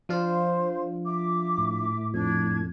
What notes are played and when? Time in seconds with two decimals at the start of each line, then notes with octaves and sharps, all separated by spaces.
0.09 F3 D4 F4 C5
1.05 E5 D6
1.58 A2
2.14 F2 D4 G#6